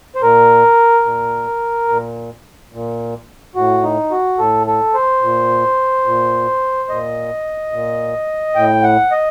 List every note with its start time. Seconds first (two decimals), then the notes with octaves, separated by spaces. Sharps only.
0.15 C5
0.22 A#2 A#4
1.05 A#2
1.89 A#2
2.73 A#2
3.55 A2 F#4
3.83 D#4
4.11 F#4
4.38 A2 A4
4.67 A4
4.94 C5
5.23 A#2
6.06 A#2
6.89 A#2 D#5
7.72 A#2
8.55 A2 G5
8.83 F#5
9.11 D#5